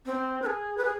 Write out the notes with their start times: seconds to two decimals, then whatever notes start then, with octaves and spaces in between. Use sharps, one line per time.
0.06 C4
0.42 B4
0.46 G#4
0.77 B4
0.85 G#4